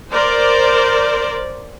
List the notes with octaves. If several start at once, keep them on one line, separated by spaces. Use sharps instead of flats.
A#4 C5 D5